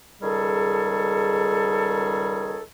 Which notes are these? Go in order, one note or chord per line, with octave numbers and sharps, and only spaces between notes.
C#2 D#3 G3 G#4 A4